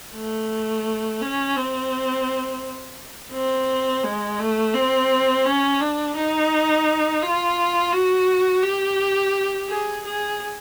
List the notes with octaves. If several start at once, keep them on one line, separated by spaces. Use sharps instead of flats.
A3
C#4
C4
C4
G#3
A3
C4
C#4
D4
D#4
F4
F#4
G4
G#4
G#4